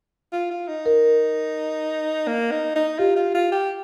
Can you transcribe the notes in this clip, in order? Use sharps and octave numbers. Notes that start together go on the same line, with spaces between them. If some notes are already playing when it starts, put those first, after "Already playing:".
F4
F4
D#4
A#4
A#3
D#4
D#4
F4 G4
F4
F4
G4